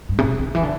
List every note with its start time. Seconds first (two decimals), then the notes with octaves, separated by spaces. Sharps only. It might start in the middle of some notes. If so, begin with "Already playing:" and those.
0.09 G2
0.18 C3
0.24 B2
0.39 D3
0.55 E3
0.63 D3